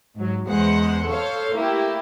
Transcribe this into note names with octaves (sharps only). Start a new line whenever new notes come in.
G#2 F#3
E2 G#3 C5 F#5
A4 C5 C#5 F5
A3 A#3 E4 G4